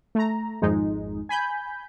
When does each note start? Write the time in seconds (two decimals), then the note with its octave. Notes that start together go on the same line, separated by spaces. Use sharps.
0.15 A3 A#5
0.62 G#1 F2 G#3 D#4
1.29 G#5 B5 G6